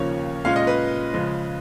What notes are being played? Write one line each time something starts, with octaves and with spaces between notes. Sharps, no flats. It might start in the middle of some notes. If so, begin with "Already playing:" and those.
Already playing: D#2 C#3 F3 A#3 C#4 C#5
A#2 G#3 C#4 F5
D#5
B4
C#3 F3 G#3